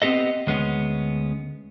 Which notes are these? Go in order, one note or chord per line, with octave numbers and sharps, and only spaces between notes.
B3 C4 G4 A4 D#5
D2 G#3 B3 C#4